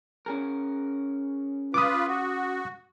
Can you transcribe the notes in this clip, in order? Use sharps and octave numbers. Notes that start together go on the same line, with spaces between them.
C#4 G#4 A#4
F4 B4 D6 D#6
F#4